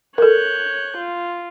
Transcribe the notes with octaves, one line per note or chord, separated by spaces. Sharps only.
A4 A#4 C#5 F#6 G6
F4